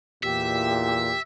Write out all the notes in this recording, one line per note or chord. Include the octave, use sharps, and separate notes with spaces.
E2 A#2 G4 E5